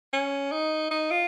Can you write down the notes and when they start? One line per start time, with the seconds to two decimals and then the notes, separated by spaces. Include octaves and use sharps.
0.13 C#4
0.52 D#4
0.91 D#4
1.11 F4